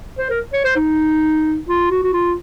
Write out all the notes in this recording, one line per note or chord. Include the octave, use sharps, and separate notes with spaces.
C5
A#4
C#5
C5
D#4
F4
F#4
F#4
F4